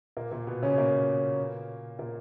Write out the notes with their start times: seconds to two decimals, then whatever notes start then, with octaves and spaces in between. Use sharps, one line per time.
0.17 A#2 A#3
0.32 A#2 A#3
0.47 B2 B3
0.62 C#3 C#4
0.77 A#2 A#3
1.99 A#2 A#3